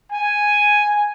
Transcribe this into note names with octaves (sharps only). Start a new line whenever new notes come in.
G#5